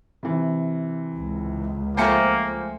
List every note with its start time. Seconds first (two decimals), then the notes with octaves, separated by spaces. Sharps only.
0.23 C3 E3
1.14 C#2
1.97 F3 A3 A#3 C5 G5 G#5 C#7